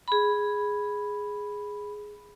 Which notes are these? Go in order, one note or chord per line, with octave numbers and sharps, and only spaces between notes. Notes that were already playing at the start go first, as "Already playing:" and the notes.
G#4 B5